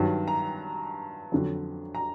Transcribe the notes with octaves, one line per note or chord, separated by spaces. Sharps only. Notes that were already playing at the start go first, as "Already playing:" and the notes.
Already playing: G2 D#3 F#3
A#5
F2 D3 F#3
A#5